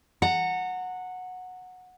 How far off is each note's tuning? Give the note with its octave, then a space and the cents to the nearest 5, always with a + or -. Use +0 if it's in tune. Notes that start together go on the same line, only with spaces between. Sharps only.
F#5 -10 A#5 -35